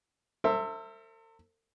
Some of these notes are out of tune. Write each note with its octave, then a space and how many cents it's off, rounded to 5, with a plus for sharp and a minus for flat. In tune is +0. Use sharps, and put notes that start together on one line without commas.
A4 +45 C5 +15 E5 +0